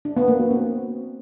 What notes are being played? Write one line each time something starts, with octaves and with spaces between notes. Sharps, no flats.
D4
B3
A#3
F#4
C4